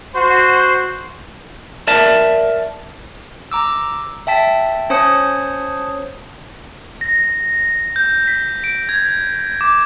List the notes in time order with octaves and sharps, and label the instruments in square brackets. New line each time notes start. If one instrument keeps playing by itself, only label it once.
[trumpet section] F#4 C5
[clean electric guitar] A#4 D5 E5 A5
[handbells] A#5 D6 E6
E5 G5 A5 B6
C#4 C5 C#5 A5 D#6 C#7
[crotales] A#6
G6
B6
D7
G#6
D6